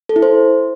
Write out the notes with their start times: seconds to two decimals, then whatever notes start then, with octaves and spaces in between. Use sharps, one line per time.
0.09 A4
0.16 E4
0.22 C5